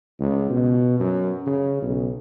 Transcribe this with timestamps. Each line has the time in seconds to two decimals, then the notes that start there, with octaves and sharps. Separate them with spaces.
0.20 C#2
0.50 B2
1.00 F#2
1.47 C#3
1.82 B1